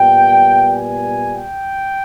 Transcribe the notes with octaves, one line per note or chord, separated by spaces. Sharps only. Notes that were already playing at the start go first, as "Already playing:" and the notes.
Already playing: A#2 G3 B3 G5
G#5
G5